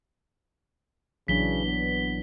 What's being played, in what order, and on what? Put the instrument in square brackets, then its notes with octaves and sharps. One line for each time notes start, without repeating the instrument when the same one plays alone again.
[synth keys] A#1 [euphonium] C#3 [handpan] E3 F#3 D4 [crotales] B6 G7
[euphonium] B3